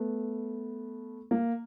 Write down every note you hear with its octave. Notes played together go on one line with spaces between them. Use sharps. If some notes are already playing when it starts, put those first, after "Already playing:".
Already playing: A3 B3
A#3